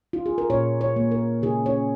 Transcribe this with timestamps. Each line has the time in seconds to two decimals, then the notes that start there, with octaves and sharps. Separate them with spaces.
0.13 F4
0.26 G#4
0.38 A#4
0.50 A#2 C#5
0.81 C#5
0.96 A#3
1.11 A#4
1.42 C#3 G#4
1.66 C#5